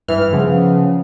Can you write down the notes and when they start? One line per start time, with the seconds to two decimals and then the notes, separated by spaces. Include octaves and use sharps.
0.08 G2 E3 F6
0.33 C#3 F3 B3